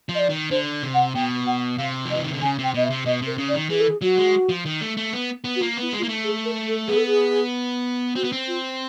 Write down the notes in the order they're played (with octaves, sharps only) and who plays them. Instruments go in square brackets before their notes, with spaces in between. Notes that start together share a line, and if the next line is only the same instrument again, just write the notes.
[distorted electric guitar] F3
[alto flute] D#5
D5
[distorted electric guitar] D#3
[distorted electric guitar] D3 [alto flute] C5
[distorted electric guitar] C3
[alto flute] F#5
[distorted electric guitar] B2 [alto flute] G5
[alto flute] F#5
[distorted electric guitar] C3 [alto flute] F5
[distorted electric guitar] F3
[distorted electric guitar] E3 [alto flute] D#5
[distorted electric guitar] D#3
D3
[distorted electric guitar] C#3 [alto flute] G#5
[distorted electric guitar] C3
[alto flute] G5
[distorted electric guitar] B2 [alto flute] D#5
[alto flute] E5
[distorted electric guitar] C3
[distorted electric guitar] B2 [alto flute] D#5
[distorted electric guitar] C3
[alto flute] A#4
[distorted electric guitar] C#3
[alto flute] D5
[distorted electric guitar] D#3
[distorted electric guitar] E3 [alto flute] G#4
[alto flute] A4
G#4
[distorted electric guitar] F#3 [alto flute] F#4
[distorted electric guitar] G#3
F3
D#3
A3
A3
B3
B3
[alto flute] F#4
[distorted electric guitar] A#3 [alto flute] F4
[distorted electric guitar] B3 [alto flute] E4
[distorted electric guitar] G#3
[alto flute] F4
[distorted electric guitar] A#3 [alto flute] E4
[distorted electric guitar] A3
[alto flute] G#4
A#4
A4
[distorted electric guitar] B3 [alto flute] G#4
[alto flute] A4
G#4
[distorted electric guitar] C4 [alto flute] F#4
[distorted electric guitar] B3
C4
[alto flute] F4